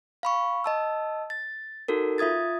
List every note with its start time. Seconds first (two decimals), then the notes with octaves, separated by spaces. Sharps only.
0.23 F5 B5 C#6
0.64 D#5 A5 E6
1.30 A6
1.88 D#4 F#4 A4 A#4
2.18 F4 E5 D#6 G#6 A6